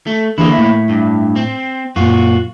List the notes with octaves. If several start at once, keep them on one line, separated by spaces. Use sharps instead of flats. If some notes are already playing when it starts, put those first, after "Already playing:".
A3
D3 E3 A#3 E4 G#4
A2 E5
G2
C4
F#2 A#2 F4 F#4